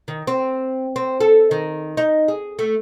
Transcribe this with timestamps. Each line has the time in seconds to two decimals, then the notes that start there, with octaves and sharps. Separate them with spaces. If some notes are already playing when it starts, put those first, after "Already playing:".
0.08 D#3
0.27 C4
0.96 C4
1.21 A4
1.51 D#3
1.97 D#4
2.28 G#4
2.59 A3